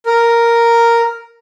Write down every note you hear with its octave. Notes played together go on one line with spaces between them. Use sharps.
A#4